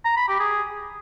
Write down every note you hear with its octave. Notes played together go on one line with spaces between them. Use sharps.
A#5
B5
G4
G#4